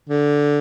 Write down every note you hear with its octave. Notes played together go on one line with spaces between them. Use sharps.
D3